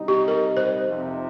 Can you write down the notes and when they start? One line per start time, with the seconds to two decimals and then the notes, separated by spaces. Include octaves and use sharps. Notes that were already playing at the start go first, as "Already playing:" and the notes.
Already playing: C3 G3 D#4
0.08 G4
0.28 A#4
0.57 C5
0.85 F2 C3 F3 D#4